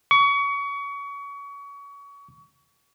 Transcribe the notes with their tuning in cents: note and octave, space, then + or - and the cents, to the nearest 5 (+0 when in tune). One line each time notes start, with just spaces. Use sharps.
C#6 +30